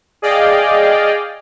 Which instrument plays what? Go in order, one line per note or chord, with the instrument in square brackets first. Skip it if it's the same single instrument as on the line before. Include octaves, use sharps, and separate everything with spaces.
[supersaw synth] G#4 D5 D#5 F5 G5